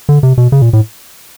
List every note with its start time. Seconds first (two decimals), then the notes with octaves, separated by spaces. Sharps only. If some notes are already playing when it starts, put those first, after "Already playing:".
0.09 D3
0.23 C3
0.38 B2
0.52 C#3
0.62 A#2
0.73 A2